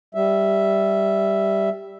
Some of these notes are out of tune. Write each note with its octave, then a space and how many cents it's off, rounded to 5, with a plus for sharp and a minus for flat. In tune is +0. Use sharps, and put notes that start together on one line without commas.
G3 +0 E5 +0